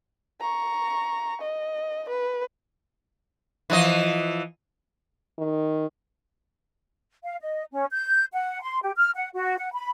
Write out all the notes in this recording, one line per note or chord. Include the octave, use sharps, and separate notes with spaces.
A#5 C#6
D#5
B4
E3 F3 D#5
D#3
F5
D#5
C#4
G6
F#5
C6
G4
F6
F#5
F#4
F#5
B5